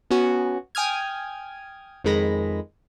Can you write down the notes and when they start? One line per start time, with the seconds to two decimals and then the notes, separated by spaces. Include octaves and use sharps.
0.11 B3 C#4 F#4
0.75 G5 G#5 D#6 F6 G#6
2.04 F2 D#3 G#3 B5 A#6